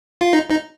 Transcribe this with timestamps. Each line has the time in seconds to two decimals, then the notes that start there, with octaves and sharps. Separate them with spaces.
0.21 F4
0.33 D#4
0.50 D#4